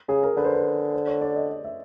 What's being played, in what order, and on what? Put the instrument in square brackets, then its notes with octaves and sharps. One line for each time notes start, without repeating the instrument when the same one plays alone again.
[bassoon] C#3 [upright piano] G#4
[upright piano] A#4
[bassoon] D3 [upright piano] B4
[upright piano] C5
B4
C5
C#5
D5
D#5
D#5
E5